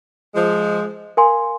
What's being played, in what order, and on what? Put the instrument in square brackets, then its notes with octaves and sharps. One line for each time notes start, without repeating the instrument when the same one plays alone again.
[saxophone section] F3 G#3
[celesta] A#4 F5 G#5 C6